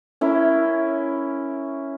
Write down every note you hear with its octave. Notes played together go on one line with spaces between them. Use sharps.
C#4 E4 A#4